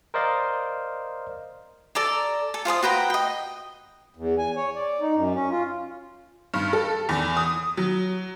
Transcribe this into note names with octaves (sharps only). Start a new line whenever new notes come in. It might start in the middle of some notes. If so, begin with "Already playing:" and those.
A#4 C5 D5 D#5 F5
A4 D5 A#5
A4
F4 C5 A5 D#6
F#4 B4 G5 A#5
D#5 G5
E2
G#5
C#5
D5
D#4
F#2
C#4
F4
G2
A4
E2
D#6
F#3